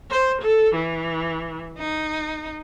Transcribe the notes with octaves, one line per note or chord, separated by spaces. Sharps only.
C5
A4
E3
D#4